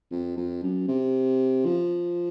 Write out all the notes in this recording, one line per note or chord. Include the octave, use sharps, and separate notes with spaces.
F2
F2
F#2
C3
F3